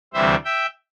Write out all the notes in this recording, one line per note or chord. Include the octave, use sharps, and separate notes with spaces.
D2 C3 E3 G3 C5 E5
E5 G5